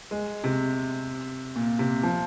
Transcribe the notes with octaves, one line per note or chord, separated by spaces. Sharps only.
G#3
C3
A#2
C3
F3